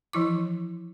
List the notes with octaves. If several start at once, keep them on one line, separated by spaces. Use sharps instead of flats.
E3 F3 E4 D6